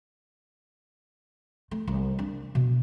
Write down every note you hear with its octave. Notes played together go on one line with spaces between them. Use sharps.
A3
C2
D4
B2